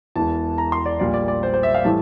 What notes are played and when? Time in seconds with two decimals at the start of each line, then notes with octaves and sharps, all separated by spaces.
0.16 E1 E2 E3 A5
0.58 A#5
0.72 C6
0.86 D5
0.99 A#1 A#2 G3 D5
1.14 D5
1.28 D5
1.43 C5
1.54 C5
1.63 E5
1.74 F5
1.84 A2 E3 G3 A5